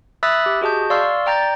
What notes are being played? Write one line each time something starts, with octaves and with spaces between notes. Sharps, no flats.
E5 B5 D#6 E6 F#6 A6
G4
F#4 G#4 D#5 A5 G6
D5 F5 C6 C#6 E6 F6
D5 G5 A#5 G6 A6